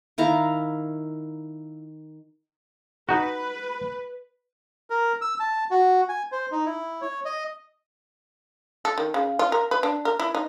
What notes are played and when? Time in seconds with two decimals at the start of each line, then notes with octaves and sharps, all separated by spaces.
0.18 D#3 E4 F5 A#5
3.09 D#4 F#4 B4
4.90 A#4
5.21 E6
5.40 A5
5.71 F#4
6.09 G#5
6.32 C5
6.52 D#4
6.66 E4
7.01 C#5
7.25 D#5
8.85 A4
8.98 D#3
9.14 C#3
9.39 F4
9.52 A#4
9.71 B4
9.83 D4
10.05 A#4
10.20 E4
10.35 D#4